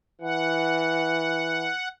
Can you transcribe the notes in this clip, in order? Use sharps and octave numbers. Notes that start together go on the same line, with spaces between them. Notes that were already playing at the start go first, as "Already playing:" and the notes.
E3 F#5